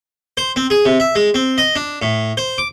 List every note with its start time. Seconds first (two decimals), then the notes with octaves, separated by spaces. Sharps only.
0.37 C5
0.56 C4
0.70 G#4
0.86 C3
1.00 E5
1.15 G#3
1.34 C4
1.58 D#5
1.76 D4
2.02 A2
2.37 C5
2.58 D6